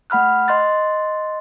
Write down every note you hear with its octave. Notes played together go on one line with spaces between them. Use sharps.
A3 F#5 B5 F6 F#6
D#5 C6 F#6 A6